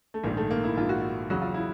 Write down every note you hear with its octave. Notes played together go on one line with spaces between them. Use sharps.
A3
A#1 G#2 D#3 A#3
A3
A#3
E4
A#1 G#2 D#3 F4
F#4
F4
E2 C#3 F#3 F#4
F4
E4